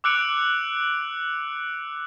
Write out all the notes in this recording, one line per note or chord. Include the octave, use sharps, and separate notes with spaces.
D6 E6 F#6 C#7 D7 F7